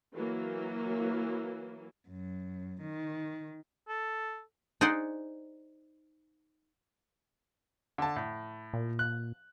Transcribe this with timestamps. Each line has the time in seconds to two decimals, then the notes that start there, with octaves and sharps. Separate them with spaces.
0.15 E3 F#3 A#3
2.07 F#2
2.82 D#3
3.89 A4
4.81 D#4 G#4 C5 D5 F#5
7.98 D3 A5
8.16 A2
8.73 A#2
8.99 F#6